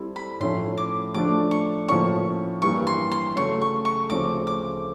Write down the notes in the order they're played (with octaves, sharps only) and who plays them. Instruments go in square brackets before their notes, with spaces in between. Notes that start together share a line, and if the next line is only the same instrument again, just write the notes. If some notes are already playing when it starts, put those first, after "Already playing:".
Already playing: [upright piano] G3 C4 E4 A4 C5
[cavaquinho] B5
[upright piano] A2 F3 A3 C#4 [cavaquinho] C6
[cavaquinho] D6
[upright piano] F3 A3 D4 [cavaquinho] D6
[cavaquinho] C#6
[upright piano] A2 F3 A#3 C#4 [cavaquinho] C#6
[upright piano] G2 E3 G3 A#3 [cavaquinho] C#6
[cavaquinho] C6
C6
[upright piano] C#3 F#3 A3 [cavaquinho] C#6
[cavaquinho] C#6
C#6
[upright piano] D2 C#3 F3 A3 C4 [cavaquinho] D6
[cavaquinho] D6